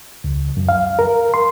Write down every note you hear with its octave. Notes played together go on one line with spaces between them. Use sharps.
C#2
F#2
F5
A#4
C6